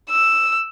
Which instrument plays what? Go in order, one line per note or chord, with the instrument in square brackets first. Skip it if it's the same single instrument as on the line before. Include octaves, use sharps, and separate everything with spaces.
[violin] E6